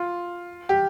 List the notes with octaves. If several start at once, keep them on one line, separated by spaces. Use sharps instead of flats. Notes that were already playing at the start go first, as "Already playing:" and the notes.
Already playing: F4
G4